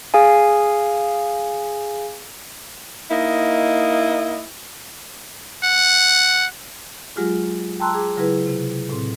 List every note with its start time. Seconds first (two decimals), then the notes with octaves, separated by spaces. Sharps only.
0.14 G#4 F5 G#5
3.10 A#3 D#4 E4 D#5
5.64 F#5
7.16 F#3 G#3 F4 G4 G#4
7.80 G5 A5 A#5 C6 E6 F#6
7.94 G#4 D6
8.17 C#3 F#3 E4 G#4 B4
8.47 C3
8.89 A2 C4